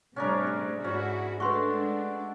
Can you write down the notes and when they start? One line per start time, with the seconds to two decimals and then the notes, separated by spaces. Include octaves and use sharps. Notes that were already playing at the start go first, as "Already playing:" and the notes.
0.16 A2 C3 G3 C#4 D4 A#4
0.47 G#4
0.84 G#2 C#4 E4 F#4
1.40 G#3 A3 D4 F#4 B4 C6 C#6